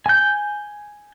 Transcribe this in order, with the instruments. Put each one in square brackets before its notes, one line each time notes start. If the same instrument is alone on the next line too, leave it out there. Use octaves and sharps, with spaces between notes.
[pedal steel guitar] G#5 G6